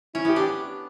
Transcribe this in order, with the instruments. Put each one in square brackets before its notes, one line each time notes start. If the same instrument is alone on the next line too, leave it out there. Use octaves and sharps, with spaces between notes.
[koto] C#4 [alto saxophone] E4
[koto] B3 [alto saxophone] G4
[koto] D4